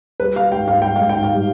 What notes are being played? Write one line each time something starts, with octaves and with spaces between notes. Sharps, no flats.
G3 B4
G3 F5
G#2 G5
G#2 F5
G3 G5
G#2 F5
G5
G#2
F5
G3